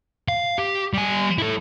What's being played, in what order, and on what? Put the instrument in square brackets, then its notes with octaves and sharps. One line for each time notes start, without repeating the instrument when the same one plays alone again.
[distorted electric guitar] F5
G4
G3 G#5
E4 A4